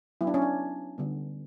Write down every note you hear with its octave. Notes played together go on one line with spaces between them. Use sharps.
F#3 B3 E4
D4
C#4
D4
D3 G3 B3